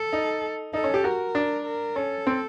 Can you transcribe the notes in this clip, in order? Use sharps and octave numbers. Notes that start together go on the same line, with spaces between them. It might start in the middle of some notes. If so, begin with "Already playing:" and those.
Already playing: A4
D#4
D#4 A4
C#4
G4
F#4 A#4
D4
A#4
C#4 A4
C4